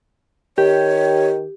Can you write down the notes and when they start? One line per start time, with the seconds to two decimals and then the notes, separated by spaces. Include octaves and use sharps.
0.58 D#3 G4 C#5